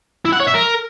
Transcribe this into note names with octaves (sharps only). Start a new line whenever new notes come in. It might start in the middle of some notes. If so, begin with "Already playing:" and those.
E4
F#5
C#5
E5
A#4